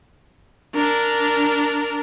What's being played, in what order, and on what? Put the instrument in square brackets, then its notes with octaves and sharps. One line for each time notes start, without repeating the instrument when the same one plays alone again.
[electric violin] D4 A#4